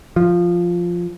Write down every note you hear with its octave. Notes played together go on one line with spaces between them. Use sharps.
F3